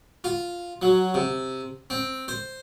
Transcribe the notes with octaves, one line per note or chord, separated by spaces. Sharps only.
F4
F#3
C3
C4
C5